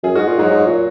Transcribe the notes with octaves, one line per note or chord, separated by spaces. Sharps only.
F#2 G#4
G#2 F#4
A#2 F4
G#2 F#3
G#2
A#2